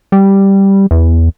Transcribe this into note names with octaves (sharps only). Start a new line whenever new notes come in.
G3
E2